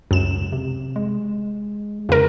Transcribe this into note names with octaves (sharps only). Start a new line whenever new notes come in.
C#2 F#2 E7
C3
G#3
E2 C#3 A#4